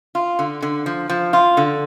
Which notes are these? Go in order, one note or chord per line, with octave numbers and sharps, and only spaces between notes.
F4
D3
D3
F3
F3
F4
D3